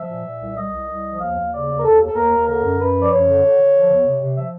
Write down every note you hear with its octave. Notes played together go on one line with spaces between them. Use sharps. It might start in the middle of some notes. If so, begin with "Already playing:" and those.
Already playing: F3 E5
A#2
A#2
C2
C2 D#5
C2
C2
F3
D#2 F5
D#2
C#3 D5
D#2
A#4
D#2 A4
D#2
A4
D#2 A#4
D#2
D3 A#4
F#2
F#2 B4
F3
D5
F#2 C#5
D3
D3
D3
F3
E2
C3
C3
F3 E5